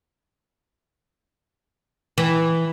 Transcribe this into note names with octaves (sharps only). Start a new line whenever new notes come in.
E3